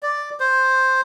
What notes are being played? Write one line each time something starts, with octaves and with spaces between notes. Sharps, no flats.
D5
C5